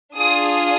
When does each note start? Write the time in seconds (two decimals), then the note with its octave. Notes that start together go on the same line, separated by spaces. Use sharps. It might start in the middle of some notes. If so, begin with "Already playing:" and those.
0.16 D4 F4 G#4 D#6
0.48 D#6